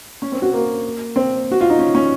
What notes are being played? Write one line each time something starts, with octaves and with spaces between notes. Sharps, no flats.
C#4
C4
F#4
A#3
C4
F#4
F4
D#4
C#4
C#4